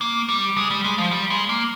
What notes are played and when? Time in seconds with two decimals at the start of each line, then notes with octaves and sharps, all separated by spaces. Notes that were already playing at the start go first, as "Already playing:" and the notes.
0.01 A#3
0.29 G3
0.57 G#3
0.70 G3
0.84 G#3
0.98 F3
1.11 G3
1.30 G#3
1.49 A#3